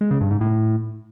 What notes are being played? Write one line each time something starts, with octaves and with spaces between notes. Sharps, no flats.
G#3
C#3
G2
G#2
A2